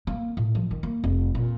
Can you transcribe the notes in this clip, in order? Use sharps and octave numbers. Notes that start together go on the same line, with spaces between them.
A#3
A2
F3
D#3
A#3
F1
A#2